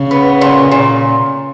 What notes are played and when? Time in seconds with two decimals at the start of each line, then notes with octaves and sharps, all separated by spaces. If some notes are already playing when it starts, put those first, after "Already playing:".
Already playing: C#3
0.11 B3
0.41 A#2
0.71 A#2